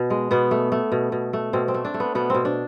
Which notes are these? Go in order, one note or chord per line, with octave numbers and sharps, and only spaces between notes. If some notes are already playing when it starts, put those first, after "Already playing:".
Already playing: B2
G#3
B2 B3
A3
A3
B2
B2
A3
B2 C4
C4
A3
D4
A3
B3
B2 B3
B2 C4
D4